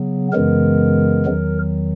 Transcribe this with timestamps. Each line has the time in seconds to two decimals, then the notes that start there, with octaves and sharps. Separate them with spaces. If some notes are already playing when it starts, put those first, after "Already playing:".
Already playing: C#3 F#3 B3
0.32 F#2 C#3 E3 G#3 B3 A#4
1.26 E2 D#3 F#3